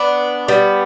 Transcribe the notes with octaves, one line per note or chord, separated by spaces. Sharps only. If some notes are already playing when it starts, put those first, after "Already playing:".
Already playing: B3 D4
G3 B3